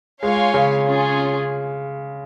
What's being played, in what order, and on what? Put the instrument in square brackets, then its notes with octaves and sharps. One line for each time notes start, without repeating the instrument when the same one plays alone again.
[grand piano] G#3 [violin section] F4 C#5 F5 G#5
[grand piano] C#3
[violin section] C#4 F4 G#4